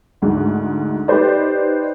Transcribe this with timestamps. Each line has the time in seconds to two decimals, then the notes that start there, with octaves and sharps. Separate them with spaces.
0.22 D2 G#2
1.08 D#4 G4 B4 C5 D5